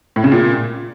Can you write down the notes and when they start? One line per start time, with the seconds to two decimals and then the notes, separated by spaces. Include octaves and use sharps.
0.16 A2
0.24 C#3
0.32 A#2